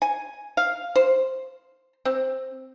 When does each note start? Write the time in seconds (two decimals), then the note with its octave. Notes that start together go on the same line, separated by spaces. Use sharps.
0.02 G#5
0.57 F5
0.96 C5
2.05 C4